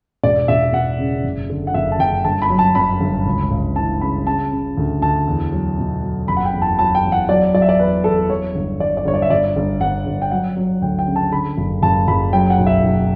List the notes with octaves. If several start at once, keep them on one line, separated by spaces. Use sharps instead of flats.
E1 D5
E1 E5
E1 F#5
C#3
F#1
D3
F#5
F#1 E5
A5
F#1 G5
G1 A5
B5
F#3
A5
F#2 B5
G1
C#2
C#2
E3 A5
C#3 B5
C#3 A5
C#3
D2
D2 A5
E2
F#3
B2
F#3
F#1 B5
F#5
G5
E2
A5
F#3 A5
G5
E2
F#5
F#3 D5
F#3 D5
E5
D5
E2 B4
E2 A4
F#3 C#5
G1
G1 D5
D5
G1 C#5
D5
E5
G1 D5
G1
G1 F#5
G1
G5
F#3 F#5
F#3
D2 G5
G5
C#3
A5
D3 B5
F#1
F#1 A5
F#1 B5
F#3 G5
F#5
B1
E5
B1